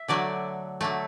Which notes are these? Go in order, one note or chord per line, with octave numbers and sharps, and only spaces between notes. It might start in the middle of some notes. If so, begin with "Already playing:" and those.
Already playing: E5
D3 F#3 A3 D5
D3 F#3 A3